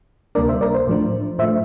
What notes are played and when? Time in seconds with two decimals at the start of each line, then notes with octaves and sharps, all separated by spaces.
0.35 D2 C3 G3 A#3 D4 A#4 D5
0.49 C5 E5
0.61 A#4 D5
0.74 C5
0.87 A2 F3 A3 D4
1.39 A2 F3 A3 D4 C5 E5